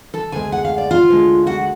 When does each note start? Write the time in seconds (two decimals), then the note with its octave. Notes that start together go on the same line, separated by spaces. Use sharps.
0.14 A4 A5
0.32 D2 C#3 G#3 G#4 G#5
0.52 F#5
0.65 F5
0.78 D5
0.91 F4 F5
1.09 D2 D3 G#3
1.47 F#4 F#5